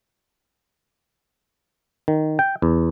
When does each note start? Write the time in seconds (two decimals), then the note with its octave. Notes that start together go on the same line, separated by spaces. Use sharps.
2.08 D#3
2.39 G5
2.62 E2